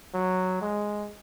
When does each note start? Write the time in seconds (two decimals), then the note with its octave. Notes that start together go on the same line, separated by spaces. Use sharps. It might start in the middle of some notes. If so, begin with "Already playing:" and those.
0.14 F#3
0.61 G#3